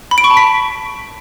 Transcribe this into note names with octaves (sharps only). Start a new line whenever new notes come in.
B5
D7
C#6
A5
B6